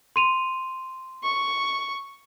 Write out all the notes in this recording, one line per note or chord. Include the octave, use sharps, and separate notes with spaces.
C6 D#7 F7
C#6